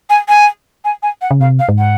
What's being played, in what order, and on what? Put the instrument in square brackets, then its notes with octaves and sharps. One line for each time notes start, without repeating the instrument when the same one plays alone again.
[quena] G#5
G#5
G#5
G#5
F#5
[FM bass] C#3
[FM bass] C3 [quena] F5
[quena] F5
[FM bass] G#2
[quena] F#5